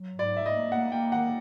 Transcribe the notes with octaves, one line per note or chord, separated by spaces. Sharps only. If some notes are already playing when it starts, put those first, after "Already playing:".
Already playing: F#3
G#2
D5
A#3 E5
D#5
A#3
A#3 F#5
A#3 G5
D#3 F#5